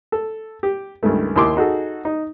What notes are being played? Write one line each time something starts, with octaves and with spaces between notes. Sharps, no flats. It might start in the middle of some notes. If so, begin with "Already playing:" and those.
A4
G4
C#2 G2 D#3 A3
D#2 E4 C6 D6
D#4 F#4 G#4 A4
D#4